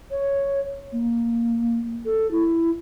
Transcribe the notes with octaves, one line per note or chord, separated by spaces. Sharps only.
C#5
A#3
A4
E4